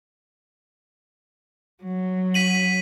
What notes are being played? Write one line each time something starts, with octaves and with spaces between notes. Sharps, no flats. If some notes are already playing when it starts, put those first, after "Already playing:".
F#3
B6 D#7 F#7